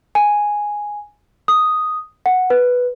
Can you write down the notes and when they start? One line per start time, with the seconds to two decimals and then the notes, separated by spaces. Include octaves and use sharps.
0.15 G#5
1.48 D#6
2.26 F#5
2.50 B4